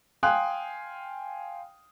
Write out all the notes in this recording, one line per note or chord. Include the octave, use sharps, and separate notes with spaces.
F5 G5 G#5 C6 D#6 F#6